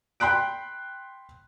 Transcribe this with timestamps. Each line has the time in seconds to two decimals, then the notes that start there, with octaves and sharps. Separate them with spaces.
0.20 G5 B5 C6 F#6 D7